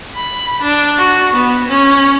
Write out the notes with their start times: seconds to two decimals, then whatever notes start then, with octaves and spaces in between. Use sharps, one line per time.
0.15 B5
0.62 D4
0.98 F#4
1.35 B3
1.68 C#4